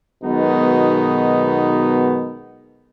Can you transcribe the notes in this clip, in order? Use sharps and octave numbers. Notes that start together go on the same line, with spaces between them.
B1 B2 D#3 G#3 B3 D#4